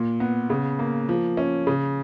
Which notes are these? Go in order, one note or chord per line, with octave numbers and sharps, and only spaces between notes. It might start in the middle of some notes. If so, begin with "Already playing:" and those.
Already playing: A#2
B3
C#3
A#3
F3
C#4
C#3